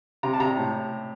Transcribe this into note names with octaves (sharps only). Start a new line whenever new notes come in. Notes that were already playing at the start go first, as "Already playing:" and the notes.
C3 A#5
A5
C3 A#5
A2